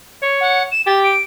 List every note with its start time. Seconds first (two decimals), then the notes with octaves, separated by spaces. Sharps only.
0.22 C#5
0.40 F#5
0.71 E7
0.87 G4 A6
1.04 D7